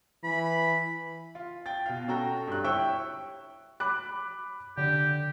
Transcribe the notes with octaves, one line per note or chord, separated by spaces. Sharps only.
E3 B5
F4
G5 A6
B2 F5
C#4 F#4 A4 G5 A#5
G2 F#6
E4 C#5 E5 G5 C#6 E6
B5 D6 F#6
D3 G4